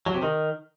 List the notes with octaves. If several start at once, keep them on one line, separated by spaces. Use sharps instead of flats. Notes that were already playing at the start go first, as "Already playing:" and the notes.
F#3
C3
D#3